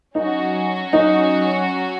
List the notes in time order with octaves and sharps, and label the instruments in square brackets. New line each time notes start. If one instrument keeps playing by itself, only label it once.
[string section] F#3 C#4 F#4 [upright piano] D#4
[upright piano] D#4